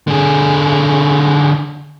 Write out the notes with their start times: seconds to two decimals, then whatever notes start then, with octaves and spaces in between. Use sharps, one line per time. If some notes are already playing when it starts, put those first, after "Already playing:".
0.07 D3 G#4